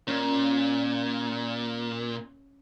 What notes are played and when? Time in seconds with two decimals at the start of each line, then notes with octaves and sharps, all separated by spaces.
0.07 A#2 C#4